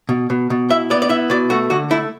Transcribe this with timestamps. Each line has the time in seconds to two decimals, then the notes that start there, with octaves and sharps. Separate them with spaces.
0.09 B2
0.30 B2
0.50 B2
0.70 E4 E5
0.90 B3 D5
1.02 D5
1.09 E4 E5
1.30 B2 D5
1.50 A3 F#4
1.70 D3 F#4
1.90 A3 E4